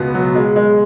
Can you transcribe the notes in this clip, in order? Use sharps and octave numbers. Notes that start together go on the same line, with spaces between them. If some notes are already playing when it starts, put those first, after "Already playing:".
Already playing: C#2 B2 B3
F#3
G#3
G#3